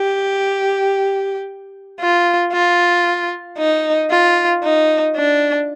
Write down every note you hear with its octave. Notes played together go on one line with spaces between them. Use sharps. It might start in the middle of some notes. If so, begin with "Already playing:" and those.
Already playing: G4
F4
F4
D#4
F4
D#4
D4